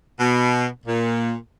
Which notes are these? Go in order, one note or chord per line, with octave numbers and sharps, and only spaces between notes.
B2
A#2